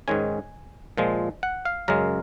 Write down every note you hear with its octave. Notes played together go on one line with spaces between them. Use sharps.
G#2 D#3 G#3 C#4 G#5
A#2 F3 G#3
F#5
F5
F#2 C#3 G#3 A#4